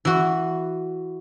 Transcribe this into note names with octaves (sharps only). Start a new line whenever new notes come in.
E3 F#4